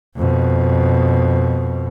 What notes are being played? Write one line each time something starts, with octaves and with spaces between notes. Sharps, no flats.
F2 B2